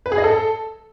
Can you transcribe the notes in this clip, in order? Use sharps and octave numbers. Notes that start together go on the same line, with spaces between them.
B4
G#4
D#5
A4